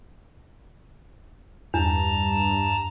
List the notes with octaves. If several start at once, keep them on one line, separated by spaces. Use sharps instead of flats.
E2 G2 A5 A#5